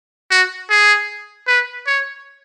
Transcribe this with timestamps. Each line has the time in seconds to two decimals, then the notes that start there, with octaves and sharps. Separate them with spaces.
0.31 F#4
0.70 G#4
1.48 B4
1.87 C#5